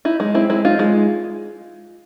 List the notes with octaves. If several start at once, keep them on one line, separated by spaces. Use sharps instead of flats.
D#4 E4
G#3
C4 E4
G#3 E4
D#4 F4
G#3